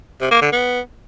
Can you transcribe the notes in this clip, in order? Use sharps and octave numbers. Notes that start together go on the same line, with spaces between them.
C3
A#3
D3
B3